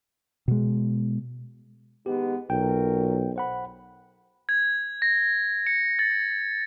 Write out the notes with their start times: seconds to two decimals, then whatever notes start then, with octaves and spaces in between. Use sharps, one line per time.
0.48 B2 G#3
2.06 D#3 G#3 B3 G4
2.50 B1 A#2 F#3 A#4 G5
3.36 C5 F#5 B5
4.49 G#6
5.02 A#6
5.67 C#7
5.99 A6